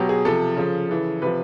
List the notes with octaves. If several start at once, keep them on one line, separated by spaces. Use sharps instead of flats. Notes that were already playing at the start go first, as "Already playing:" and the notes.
Already playing: B2 F#3 G4
G#4
C3 F3 A4
C#3 F3
C#3 E3
C3 F3 B4